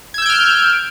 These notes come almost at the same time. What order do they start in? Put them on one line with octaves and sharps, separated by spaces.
G#6 E6 G6 D7 F6